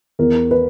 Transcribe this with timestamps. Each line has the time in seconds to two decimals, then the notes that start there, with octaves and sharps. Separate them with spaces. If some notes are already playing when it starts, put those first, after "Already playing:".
0.19 E2 A#4
0.51 B4